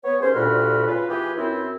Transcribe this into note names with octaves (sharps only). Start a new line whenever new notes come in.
B3 C#5
D#2 G#3 C#4 C5
D2 G2 A#2 F#4 B5 F6
C#3 B3 F4 B4
E3 B3 F4 G4 G#4 B4
F#2 C4 E4